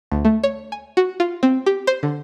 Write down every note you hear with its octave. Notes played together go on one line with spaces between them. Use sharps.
D2
A3
C#5
G#5
F#4
F4
C4
G4
C5
D3